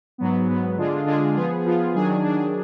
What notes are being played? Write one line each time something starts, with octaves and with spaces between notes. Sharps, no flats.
G#2 F#3 B3
G#2 F#3 B3
D3 G#3 D4 F4 G#4
D3 G#3 D4 F4 G#4
F3 B3 F4 G#4
F3 B3 F4 G#4
D#3 F#3 D4 G#4
D#3 F#3 D4 G#4